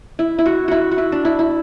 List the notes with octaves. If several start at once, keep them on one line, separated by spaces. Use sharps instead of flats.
E4
E4
F#4
E4 F#4
F#4
E4
D4
E4
E4